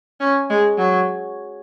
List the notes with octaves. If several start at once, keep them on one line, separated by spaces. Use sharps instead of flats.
C#4
G#3
F#3